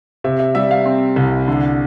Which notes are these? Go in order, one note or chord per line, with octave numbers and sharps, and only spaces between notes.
C3 E5
E5
G3 E5
F5
C4
C2
D3